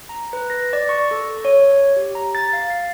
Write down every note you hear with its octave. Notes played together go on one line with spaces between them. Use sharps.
A#5
B4
A#6
D5
C#6
A4
C#5
G4
A#5
A6
F5
C7